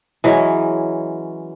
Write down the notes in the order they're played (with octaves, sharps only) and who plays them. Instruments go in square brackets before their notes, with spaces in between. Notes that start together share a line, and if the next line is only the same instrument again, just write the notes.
[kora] E3 F#3 G#3 C#4